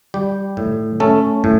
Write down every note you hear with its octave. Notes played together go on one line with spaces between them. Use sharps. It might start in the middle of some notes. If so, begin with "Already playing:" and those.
G3 G4
A2
A3 C#4 A4
A2